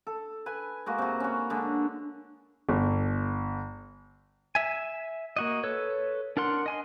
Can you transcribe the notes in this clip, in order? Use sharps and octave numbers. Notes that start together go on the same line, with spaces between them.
A4
B4 G#5
G#3 A#3 F#4
C3 F#4
C#4 F#4
D3 G#3 D4
G1
E5 G#5
A#3 F#4 D#5
A4 B4 C#5
D4 A#4 F#5 C6
D#5 G#5 C6